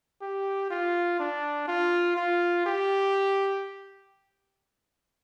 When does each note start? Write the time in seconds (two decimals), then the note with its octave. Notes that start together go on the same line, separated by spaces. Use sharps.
0.21 G4
0.70 F4
1.20 D4
1.68 F4
2.17 F4
2.66 G4